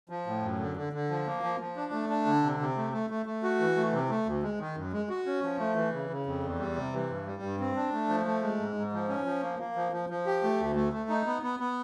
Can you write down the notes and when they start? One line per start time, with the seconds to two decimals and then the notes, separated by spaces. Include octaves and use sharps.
0.09 F3
0.27 A2
0.43 F#2
0.59 D3
0.77 D3
0.93 D3
1.10 F3
1.27 A#3
1.43 F3
1.60 F3
1.76 D4
1.92 A3
2.09 D4
2.26 D3
2.42 C3
2.60 C3
2.77 A3
2.93 A3
3.10 A3
3.26 A3
3.43 F#4
3.60 E3
3.76 A3
3.93 C3
4.10 A3
4.26 D2
4.43 G#3
4.60 D#3
4.76 F#2
4.93 G#3
5.09 F#4
5.26 C#4
5.43 F3
5.59 A3
5.75 E3
5.93 C#3
6.10 C#3
6.26 F2
6.43 E2
6.59 G3
6.76 C3
6.93 E3
7.10 G2
7.26 G3
7.42 G2
7.60 C4
7.76 D4
7.93 A3
8.09 F3
8.25 A3
8.42 G#3
8.59 G#2
8.75 G#2
8.93 F3
9.09 C#4
9.26 F3
9.42 A#3
9.59 A#3
9.76 F3
9.92 F3
10.10 F3
10.26 G4
10.43 A3
10.60 D2
10.76 A3
10.93 A3
11.09 D#4
11.26 B3
11.43 B3
11.60 B3